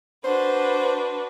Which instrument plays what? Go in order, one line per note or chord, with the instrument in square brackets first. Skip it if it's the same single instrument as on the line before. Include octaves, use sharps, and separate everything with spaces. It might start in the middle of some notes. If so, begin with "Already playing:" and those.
[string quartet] D4 F#4 B4 [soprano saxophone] C5